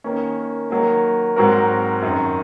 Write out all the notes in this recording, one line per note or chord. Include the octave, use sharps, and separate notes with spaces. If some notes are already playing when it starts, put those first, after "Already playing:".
D#3 A#3 C#4
D#3 F#3 A#3
G#2 F#3 C4 F#4 A#4
F#2 D#3 F#3